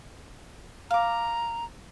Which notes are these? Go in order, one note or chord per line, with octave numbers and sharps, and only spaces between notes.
F5 A#5 D6